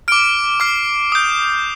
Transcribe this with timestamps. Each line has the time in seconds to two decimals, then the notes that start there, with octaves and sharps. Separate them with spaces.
0.08 D6 F6 D7
0.60 D6 F6 C7
1.12 D#6 G6